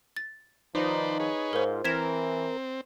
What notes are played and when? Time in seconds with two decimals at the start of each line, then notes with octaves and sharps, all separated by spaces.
0.16 A6
0.75 D#3 F3 D#4 B4 C5 D5
1.20 G#4 B4 C#5
1.53 G#2 F4 A#4 C5
1.84 E3 C4 A#4 G#6 B6 E7